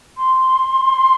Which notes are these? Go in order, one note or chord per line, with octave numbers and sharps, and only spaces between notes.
C6